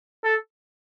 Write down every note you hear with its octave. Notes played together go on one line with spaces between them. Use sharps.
A4